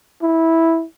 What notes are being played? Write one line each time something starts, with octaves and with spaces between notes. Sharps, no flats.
E4